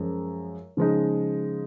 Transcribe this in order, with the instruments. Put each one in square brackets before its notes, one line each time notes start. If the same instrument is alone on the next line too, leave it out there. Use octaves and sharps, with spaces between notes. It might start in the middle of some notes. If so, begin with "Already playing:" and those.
Already playing: [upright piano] F#2 F3 G#3
C#3 F3 G#3 D#4